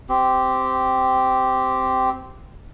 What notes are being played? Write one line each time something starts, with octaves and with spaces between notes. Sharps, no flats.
C4 G4